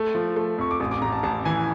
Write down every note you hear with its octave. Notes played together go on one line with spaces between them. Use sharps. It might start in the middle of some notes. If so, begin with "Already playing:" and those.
Already playing: A3
F3
A3
F2 C#6
D6
A1 D#6
D6
A1 A#5
A5
A1 A5
E3 G#5